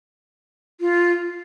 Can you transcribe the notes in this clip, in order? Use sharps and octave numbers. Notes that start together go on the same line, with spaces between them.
F4